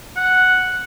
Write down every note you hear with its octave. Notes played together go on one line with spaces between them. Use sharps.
F#5